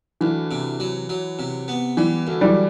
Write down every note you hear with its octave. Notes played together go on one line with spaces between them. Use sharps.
D2 E3
C3
F#3
F#3
C3
B3
E3 G3
D2
E3 G3